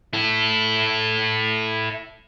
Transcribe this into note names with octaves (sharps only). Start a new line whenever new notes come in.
E4 A4